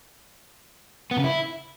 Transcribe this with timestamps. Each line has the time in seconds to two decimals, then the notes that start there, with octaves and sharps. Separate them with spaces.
1.11 B3
1.18 C#3
1.24 E4